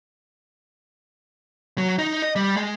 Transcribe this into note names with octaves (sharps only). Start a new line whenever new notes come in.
F#3
D#4
D#5
G3
G#3